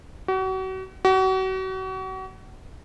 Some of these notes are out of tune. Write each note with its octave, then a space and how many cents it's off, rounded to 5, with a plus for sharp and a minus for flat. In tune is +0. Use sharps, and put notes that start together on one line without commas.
F#4 +35
F#4 +35